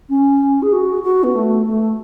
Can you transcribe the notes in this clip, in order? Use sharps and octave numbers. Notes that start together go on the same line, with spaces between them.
C#4
G#4
F#4
F#4
B3
A3
A3